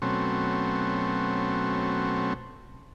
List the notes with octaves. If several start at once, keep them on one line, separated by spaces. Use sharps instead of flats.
B2 F#3 A3 C4 C#4